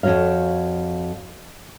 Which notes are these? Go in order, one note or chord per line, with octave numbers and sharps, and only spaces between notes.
F2 C#3 F#4 C#5 F5